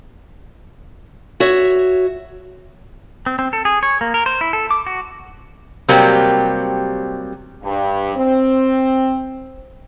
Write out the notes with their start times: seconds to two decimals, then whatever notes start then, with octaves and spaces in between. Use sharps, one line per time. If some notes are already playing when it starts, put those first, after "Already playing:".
1.40 F#4 C#5 E5
3.26 C4
3.39 C4
3.53 A4
3.65 G#4
3.83 C#5
4.01 A#3
4.14 A#4
4.26 C5
4.41 E4
4.53 A4
4.71 D6
4.87 F#4
5.89 C3 F#3 G3 A#3 C4
7.63 G2
8.16 C4